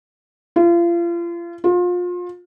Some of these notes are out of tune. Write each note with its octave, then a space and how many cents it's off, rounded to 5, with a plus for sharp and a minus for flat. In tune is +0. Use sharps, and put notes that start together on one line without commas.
F4 -35
F4 +30